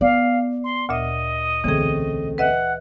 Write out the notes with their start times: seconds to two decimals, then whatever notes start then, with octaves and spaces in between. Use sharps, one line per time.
0.01 B3 D5 F5
0.63 C6
0.89 D2 A#2 D#5 E5
1.64 B1 D3 E3 A3 C4 C#4 G#4
2.38 B4 D#5 E5 F#5